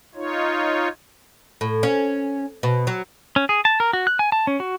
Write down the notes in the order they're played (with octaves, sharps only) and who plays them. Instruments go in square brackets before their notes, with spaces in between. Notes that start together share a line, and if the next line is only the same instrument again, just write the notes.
[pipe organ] D#4 F4 C#5
[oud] A2
C#4
B2
F#3
[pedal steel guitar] C#4
G#4
A5
A#4
F#4
F#6
G#5
A5
C#4
F#4